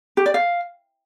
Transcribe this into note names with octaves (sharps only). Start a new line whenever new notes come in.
G4
D5
F5